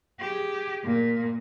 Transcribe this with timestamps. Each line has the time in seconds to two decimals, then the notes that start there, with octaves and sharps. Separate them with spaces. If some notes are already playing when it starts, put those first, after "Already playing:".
0.20 G4 G#4
0.84 A#2 A#3